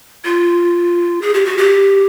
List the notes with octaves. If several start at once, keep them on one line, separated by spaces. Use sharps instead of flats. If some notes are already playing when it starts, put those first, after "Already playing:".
F4
G#4
G4
F#4
G4